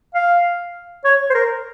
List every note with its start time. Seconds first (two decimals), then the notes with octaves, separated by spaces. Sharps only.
0.14 F5
1.04 C#5
1.30 C5
1.34 A#4